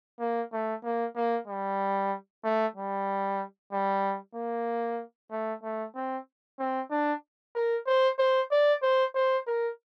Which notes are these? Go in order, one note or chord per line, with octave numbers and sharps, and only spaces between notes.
A#3
A3
A#3
A#3
G3
A3
G3
G3
A#3
A3
A3
C4
C4
D4
A#4
C5
C5
D5
C5
C5
A#4